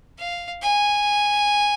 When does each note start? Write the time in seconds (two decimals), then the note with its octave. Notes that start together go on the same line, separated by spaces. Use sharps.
0.18 F5
0.62 G#5